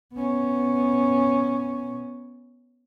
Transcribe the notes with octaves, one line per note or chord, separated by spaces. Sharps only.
B3 C#4